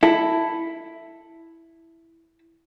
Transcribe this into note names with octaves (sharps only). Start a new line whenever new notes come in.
E4 A4